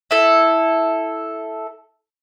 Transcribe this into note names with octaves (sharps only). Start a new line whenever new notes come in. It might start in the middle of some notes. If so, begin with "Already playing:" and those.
E4 A4